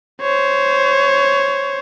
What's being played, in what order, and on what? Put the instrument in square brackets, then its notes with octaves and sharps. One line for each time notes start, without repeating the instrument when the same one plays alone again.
[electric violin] C5 C#5